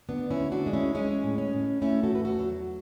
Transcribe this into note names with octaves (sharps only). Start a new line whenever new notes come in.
D2 B3 D4
C#4 E4
D2
D4 F#4
G#3
C#4 E4
G#3 C#4
A2
C#4
A2
A3 C#4 E4
F#4 A4
E2 B4
F#4 A4
F#3